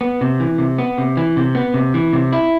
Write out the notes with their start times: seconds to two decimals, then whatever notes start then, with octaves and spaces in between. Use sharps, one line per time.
0.01 B3
0.21 C3
0.40 E3
0.58 C3
0.78 B3
0.98 C3
1.17 E3
1.37 C3
1.55 B3
1.74 C3
1.94 E3
2.13 C3
2.33 E4